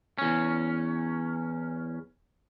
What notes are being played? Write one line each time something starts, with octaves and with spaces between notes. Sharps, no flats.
E2 C#4